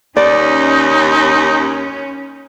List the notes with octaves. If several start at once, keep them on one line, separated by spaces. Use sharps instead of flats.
D#2 C#4 D#4 D5